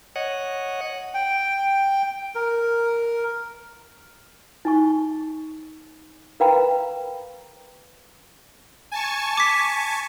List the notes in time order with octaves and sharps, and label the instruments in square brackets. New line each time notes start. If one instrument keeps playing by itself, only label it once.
[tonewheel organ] C#5 D#5 F#5
[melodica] G5
A#4
[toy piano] D#4 G#5 C#6
A#4 B4 F5 G5 A#5 B5
[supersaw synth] G#5 A5 C#6
[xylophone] D6 B6